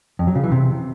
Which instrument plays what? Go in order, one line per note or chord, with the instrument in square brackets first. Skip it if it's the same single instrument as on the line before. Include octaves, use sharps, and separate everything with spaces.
[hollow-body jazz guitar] F2
F#3
C#3
E3
C3